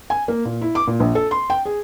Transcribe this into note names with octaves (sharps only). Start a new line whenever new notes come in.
G#5
A#3
A#2
E4
D6
A#2
A#1
A4
C6
G5
G#4